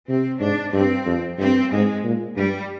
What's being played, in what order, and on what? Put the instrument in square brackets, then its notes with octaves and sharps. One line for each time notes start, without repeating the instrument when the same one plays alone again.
[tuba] C3 [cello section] C4
[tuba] G#2 [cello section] D4
[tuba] G2 [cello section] C4
[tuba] F2
[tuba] G2 [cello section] C4
[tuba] G#2 [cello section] G#3
[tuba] A#2
[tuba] G2 [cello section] G3